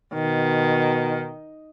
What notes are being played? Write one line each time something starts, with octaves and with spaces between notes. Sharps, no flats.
B2 D#3